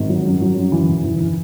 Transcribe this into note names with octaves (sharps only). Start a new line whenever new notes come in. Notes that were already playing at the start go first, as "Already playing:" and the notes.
Already playing: G#1
F#3
F#2
F#3
F#2
E3
E1
E3
E3